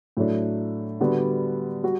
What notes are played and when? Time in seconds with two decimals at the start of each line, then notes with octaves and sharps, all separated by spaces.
0.17 A2 F#3 A3 D4
1.00 D3 G3 B3 F#4 B4
1.83 G3 F#4